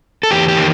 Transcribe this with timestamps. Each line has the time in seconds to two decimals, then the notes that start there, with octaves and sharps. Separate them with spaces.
0.23 A4
0.31 E2 G4
0.48 G4
0.57 D#3